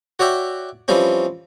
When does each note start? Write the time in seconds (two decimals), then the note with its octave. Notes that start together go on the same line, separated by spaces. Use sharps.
0.19 F#4 C#5 D5 E5 G5
0.88 E3 F3 G3 C4 C#4